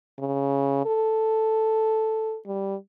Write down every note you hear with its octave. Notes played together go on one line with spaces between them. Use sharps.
C#3
A4
G3